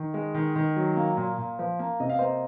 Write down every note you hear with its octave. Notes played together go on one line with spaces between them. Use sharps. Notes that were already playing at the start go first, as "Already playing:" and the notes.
Already playing: D#3
G#3
D#3
D#3
F#3
A#3
A#2
A#2
F3
A#3
C3 D#5
F5
A#3 C5 D#5